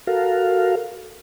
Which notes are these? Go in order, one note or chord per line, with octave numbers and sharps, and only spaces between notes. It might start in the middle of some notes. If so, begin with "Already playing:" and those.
F#4 A4 A#4 F5